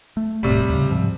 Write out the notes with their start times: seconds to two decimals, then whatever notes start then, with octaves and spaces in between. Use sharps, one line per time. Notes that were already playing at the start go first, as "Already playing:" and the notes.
0.17 A3
0.43 E1 A2 C3 G3
0.70 D#2 C#3
0.90 G#2 C3 F3